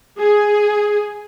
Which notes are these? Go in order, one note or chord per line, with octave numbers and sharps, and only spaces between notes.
G#4